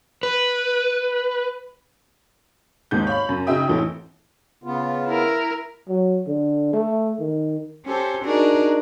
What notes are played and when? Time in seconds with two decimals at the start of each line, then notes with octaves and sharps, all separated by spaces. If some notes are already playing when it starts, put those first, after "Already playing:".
0.23 B4
2.91 G#1 D#2 G#2 G6
3.07 C#5 F5 B5
3.29 F#2
3.47 C#3 D#4 F#4 E5 G5 D#6
3.67 A1 F2 E3 A4 C#5
4.64 C#3 B3 F4
5.08 E4 A#4
5.89 F#3
6.27 D3
6.73 A3
7.20 D#3
7.85 C#4 G4 A4 C5
8.24 D4 D#4 F#4 G#4 A#4